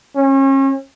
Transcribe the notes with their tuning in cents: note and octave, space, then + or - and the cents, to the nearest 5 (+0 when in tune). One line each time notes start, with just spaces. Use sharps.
C#4 -35